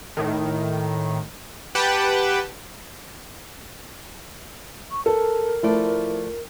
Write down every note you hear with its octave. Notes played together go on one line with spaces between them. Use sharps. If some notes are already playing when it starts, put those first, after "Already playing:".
A2 D#3
G4 B4 F#5 G5 A5
C#6
A4 A#4
F3 A3 E4 D5